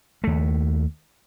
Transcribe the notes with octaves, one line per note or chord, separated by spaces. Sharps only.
D#2 A3